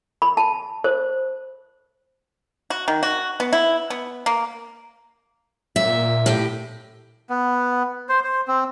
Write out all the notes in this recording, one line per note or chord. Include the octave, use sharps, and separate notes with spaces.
B5
A5
C5
F#4
D#3
F#4
B3
E4
B3
A#3
A#2 E5
A2 G4
B3
C5
C5
C4